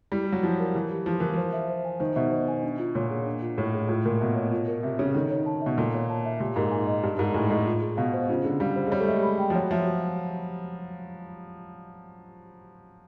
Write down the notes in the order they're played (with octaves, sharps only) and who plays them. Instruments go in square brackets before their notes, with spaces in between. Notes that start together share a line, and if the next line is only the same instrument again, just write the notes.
[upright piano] G3 [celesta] E4
[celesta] G4
[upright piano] F#3
[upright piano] F3 [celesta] E4
[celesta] A#4
[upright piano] E3 [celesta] E4
[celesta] G4
[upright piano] F3 [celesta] E4
[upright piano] E3 [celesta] A#4
[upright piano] F3 [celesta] C5
[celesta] E5
C5
G#5
[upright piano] D#3 [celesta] C5
[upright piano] B2 [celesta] E5
[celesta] C5
G#5
D4
F4
[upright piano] A#2 [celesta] C#5
[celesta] G#4
D4
F4
[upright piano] A2 [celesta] C#5
[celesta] G#4
[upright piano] A2 [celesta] F4
[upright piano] A#2 [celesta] A#4
[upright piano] B2 [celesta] E5
[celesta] C#5
F4
A#4
[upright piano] C3 [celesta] E5
[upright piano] C#3 [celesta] C#5
[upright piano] D#3 [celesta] A4
[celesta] C#5
A5
[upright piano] B2 [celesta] E5
[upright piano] A#2 [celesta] A4
[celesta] C#5
A5
E5
[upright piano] A#2 [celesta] G4
[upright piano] G#2 [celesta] A#4
[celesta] G#5
D#5
[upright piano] G2 [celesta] G4
[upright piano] G#2 [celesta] A#4
[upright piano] A2 [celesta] G#5
[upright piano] A2 [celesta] D#5
[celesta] F4
G#4
[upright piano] B2 [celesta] F5
[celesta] C5
[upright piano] C#3 [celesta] F4
[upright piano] D3 [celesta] G#4
[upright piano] G3 [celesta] F5
[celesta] C5
[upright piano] G#3
[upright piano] G3 [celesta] C#5
[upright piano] A3
[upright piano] G#3 [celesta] E5
[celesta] B5
G5
[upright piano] F3
[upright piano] F#3 [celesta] C#5
[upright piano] F3 [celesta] E5